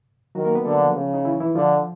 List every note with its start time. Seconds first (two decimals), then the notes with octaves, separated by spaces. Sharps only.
0.35 D#3 F#3 F#4
0.45 A#3 A#4
0.55 B3 B4
0.65 D3 A3 A4
0.80 F3 F4
0.96 C#3
1.14 D#4
1.25 E3 E4
1.40 E3 E4
1.56 D3 F3 F4